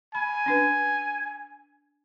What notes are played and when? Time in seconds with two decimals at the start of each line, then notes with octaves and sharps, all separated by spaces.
0.15 G#5 B5
0.46 C#4 D4 B4